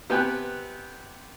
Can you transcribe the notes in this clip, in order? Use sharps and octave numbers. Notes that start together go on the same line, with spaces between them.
C3 B3 B4 G5 G#5 F#6